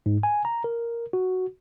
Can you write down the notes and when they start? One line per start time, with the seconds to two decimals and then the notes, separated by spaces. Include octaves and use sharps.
0.06 G#2
0.23 G#5
0.45 A#5
0.64 A#4
1.13 F#4